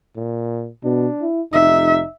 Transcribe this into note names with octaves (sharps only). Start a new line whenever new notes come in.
A#2
B2 D4
E4
F1 D#4 E5